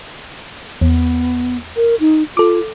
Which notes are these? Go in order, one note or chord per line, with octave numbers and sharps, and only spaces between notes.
E2 B3
A#4
D#4
F4 A4 D6